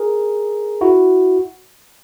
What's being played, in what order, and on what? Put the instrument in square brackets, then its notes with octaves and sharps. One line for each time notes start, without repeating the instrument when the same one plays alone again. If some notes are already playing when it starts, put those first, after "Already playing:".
Already playing: [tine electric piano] G#4 A#4
E4 F#4